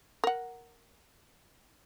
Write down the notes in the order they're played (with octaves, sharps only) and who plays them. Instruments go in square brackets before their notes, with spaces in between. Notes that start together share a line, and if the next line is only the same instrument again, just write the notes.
[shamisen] A#4 F#5